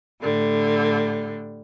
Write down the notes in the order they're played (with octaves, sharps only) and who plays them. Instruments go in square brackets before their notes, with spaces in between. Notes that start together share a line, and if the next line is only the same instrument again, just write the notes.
[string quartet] A2 D3 G3